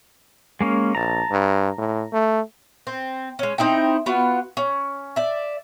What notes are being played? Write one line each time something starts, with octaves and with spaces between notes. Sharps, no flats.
G#3 A#3 C#4
A#1 A5 A#5
G2
A2
A3
C4
G#3 C#4
C4 D#4 E4 G5
B3 F4 F#4
C#4
D5 E5